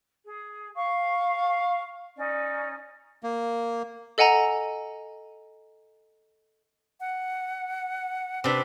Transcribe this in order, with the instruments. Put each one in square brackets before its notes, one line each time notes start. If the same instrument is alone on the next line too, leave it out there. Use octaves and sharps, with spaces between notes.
[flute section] G#4
F5 C#6
C#4 D#4 D5
[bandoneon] A#3
[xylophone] A4 D#5 F#5 G#5 A#5
[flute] F#5
[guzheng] C3 D4 [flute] B4